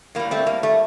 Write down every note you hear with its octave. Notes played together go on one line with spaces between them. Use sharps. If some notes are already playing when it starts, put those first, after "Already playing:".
A2 G3 A#3
A3 C4
A#3
A3